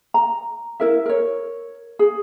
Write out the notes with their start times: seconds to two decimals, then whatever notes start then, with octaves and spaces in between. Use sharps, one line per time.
0.14 A#5
0.80 E4 A#4 E5
1.06 A#4 C#5
1.99 G#4